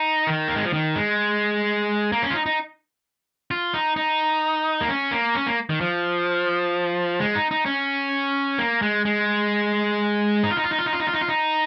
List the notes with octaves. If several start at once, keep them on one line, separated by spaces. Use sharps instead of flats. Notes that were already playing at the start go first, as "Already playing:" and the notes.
Already playing: D#4
D#3
A#3
G#3
F3
D#3
G#3
A#3
C#4
F4
D#4
D#4
F4
D#4
D#4
A#3
C#4
A#3
C#4
A#3
D#3
F3
G#3
D#4
D#4
C#4
A#3
G#3
G#3
D#4
F4
D#4
F4
D#4
F4
D#4
F4
D#4
F4
D#4
F4
D#4